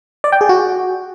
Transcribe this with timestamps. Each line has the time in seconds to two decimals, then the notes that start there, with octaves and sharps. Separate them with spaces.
0.24 D5
0.32 G5
0.41 G#4
0.49 F#4